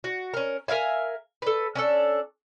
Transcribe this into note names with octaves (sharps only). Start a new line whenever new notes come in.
F#4
C#4 A#4
A#4 E5 F5 G#5
A4 B4
C#4 D4 A4